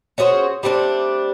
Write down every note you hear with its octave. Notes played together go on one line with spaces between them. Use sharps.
C#4 F#4 G#4 C5
G3 A3 C4 D4